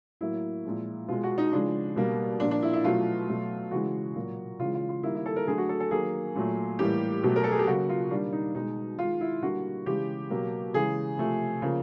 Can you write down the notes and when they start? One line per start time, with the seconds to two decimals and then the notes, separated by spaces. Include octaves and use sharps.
0.21 A2 F#3 A#3 E4
0.65 A#2 F3 G#3
1.08 B2 G#3 F4
1.24 F#4
1.38 D#4
1.52 C#3 F3 G#3 D4
1.96 B2 G3 A#3
2.40 A#2 F3 A#3 D4
2.51 D4
2.62 E4
2.73 E4
2.84 B2 F#3 A3 F4
3.28 B2 F#3 A3
3.71 C#3 E3 G#3 F#4
4.16 A#2 F#3 A#3
4.59 C#3 E3 G#3 F4
4.74 F4
4.89 F4
5.03 D#3 G3 A#3 E4
5.15 E4
5.26 A4
5.36 A#4
5.47 D3 F#3 A3 G#4
5.58 F#4
5.69 A4
5.80 A4
5.91 D#3 F#3 A#3 G#4
6.35 A#2 F#3 A3
6.79 A2 E3 G3 A#3 G4
7.23 B2 F#3 A3
7.36 A#4
7.44 A4
7.51 G#4
7.59 G4
7.67 C#3 F#3 A#3 F#4
7.89 F4
8.11 D#3 G3 A#3 D4
8.32 D#4
8.55 B2 G#3 D#4
8.98 D#3 G#3 F4
9.21 E4
9.42 D3 G3 A#3 F#4
9.86 C#3 E3 G#3 G4
10.30 B2 F#3 A#3
10.74 C#3 E3 G#3 G#4
11.18 C3 F3 A3
11.62 C#3 F3 A#3